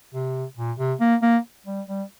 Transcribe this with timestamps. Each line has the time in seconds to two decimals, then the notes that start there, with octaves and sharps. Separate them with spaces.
0.14 C3
0.57 A#2
0.79 C3
1.00 A#3
1.23 A#3
1.66 G3
1.87 G3